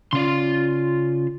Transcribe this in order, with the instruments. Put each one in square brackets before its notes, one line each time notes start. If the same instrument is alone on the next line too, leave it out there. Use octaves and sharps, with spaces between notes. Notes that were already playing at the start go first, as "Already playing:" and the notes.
[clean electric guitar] C#3 C#4 D5 [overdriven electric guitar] F4 C6